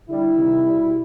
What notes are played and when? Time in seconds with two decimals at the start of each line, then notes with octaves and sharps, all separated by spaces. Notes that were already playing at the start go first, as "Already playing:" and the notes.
0.08 D3 G3 E4
0.38 C3 D#3 G3
0.66 B2 G3